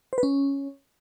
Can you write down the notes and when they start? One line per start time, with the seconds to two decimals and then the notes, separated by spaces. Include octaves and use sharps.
0.13 C5
0.18 B4
0.23 C#4